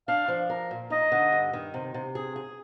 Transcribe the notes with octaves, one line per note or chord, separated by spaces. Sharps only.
D4 F5
F3
A#4
A#2
D#4 D#5
D3
G2
D#3
C3
C3
G#4
G#4